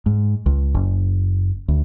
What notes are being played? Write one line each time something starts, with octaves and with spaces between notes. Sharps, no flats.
G#2
C#2
F#1
D2